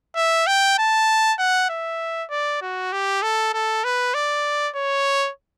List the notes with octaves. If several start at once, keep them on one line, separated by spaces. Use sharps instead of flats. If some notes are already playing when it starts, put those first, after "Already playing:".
E5
G5
A5
F#5
E5
D5
F#4
G4
A4
A4
B4
D5
C#5